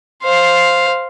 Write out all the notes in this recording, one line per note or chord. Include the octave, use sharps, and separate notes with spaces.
C5 F5